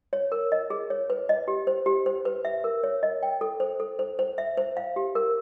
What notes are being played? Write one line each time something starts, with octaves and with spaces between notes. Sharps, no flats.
C#5
A#4
D#5
G#4
C#5
B4
D#5
G4
C5
G4
C5
B4
E5
A#4
C#5
D#5
G5
A4
C5
A4
C5
C5
E5
C5
F5
G4
A#4